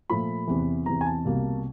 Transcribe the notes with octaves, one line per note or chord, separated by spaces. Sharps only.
A#2 F3 A3 B5
E2 C3 E3
E2 C3 E3 A#5
G#5
A5
C2 B2 G3 A#3